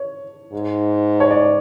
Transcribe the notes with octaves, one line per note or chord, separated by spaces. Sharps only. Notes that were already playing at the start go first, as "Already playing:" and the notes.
Already playing: C#5
G#2
C#5
D5